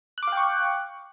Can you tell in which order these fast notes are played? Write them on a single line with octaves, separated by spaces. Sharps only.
F#6 D6 F5 G5 C#6